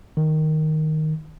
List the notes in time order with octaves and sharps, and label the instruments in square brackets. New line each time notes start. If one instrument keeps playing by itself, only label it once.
[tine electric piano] D#3